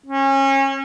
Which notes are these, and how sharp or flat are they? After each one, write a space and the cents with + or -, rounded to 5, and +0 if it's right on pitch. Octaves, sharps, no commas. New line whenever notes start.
C#4 -30